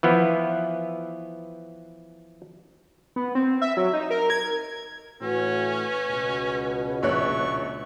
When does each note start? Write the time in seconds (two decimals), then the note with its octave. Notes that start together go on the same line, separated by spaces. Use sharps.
0.03 E3 F3 B3
3.16 B3
3.35 C4
3.62 E5
3.77 F#3
3.93 D#4
4.10 A#4
4.30 G#6
5.22 A2 E3 C#4 F#4 B4
6.07 C#2 B2
7.03 A#1 C#5 C#6 F#6